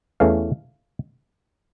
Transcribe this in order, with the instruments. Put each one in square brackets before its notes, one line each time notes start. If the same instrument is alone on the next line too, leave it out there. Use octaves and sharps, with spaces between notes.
[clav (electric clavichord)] E2 E3 A3 C#4 F5